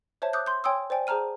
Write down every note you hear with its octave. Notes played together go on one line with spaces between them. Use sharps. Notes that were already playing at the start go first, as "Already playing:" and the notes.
C5 C#5 E5 A5
D6 D#6 F#6 G6
C6 G6
C#5 G5 G#5 C6 D#6 E6
C5 D5 G5 G#5
G#4 C5 A5 A#5 F6 D#7